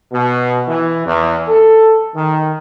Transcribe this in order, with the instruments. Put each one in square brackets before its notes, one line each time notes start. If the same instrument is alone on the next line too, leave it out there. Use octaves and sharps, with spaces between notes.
[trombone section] B2
E3
E2
A4
D#3